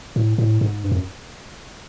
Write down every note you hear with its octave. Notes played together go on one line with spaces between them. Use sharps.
A2
A2
G#2
G2
F#2